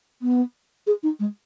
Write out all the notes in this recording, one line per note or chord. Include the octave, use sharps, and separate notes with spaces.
B3
G#4
D#4
G#3